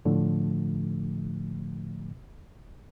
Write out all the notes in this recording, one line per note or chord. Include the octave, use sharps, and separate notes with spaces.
A2 D3 F3 A3